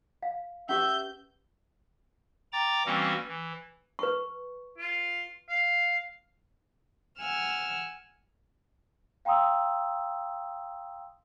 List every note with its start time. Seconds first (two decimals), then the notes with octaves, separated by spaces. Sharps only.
0.23 F5
0.69 C#4 G4 B4 E5 G6
2.52 G5 A#5 D6 A6
2.86 E3 G3 A#3 C4 C#4 F#4
3.28 E3
3.99 B4 C#6
4.78 F4
5.49 F5
7.17 F#5 G#5 E6 F6
9.25 F5 G5 A#5 C6 D#6 E6